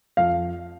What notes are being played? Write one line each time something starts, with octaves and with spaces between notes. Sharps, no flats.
F2 F5